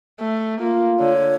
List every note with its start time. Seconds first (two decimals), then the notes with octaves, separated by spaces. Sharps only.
0.19 A3
0.61 A#3 F4
0.99 D3 C#5